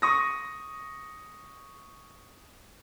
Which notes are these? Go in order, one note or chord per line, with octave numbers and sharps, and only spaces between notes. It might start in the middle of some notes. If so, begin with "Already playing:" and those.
C#6 D#6 A#6